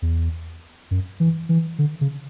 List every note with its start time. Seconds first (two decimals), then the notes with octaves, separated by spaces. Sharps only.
0.02 E2
0.91 F#2
1.20 E3
1.49 E3
1.78 D3
2.01 C#3